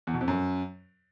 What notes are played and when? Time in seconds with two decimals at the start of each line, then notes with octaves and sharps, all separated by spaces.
0.07 E2
0.14 B2
0.21 F2
0.28 F#2